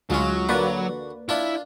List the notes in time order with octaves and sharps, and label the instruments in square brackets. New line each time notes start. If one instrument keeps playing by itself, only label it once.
[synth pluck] D2 F4 [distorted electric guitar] F#3 [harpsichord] G#3 C#4
[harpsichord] D3 F#4 [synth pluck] A#3 B4 D5
[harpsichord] D4 F4 [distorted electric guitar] E4 E5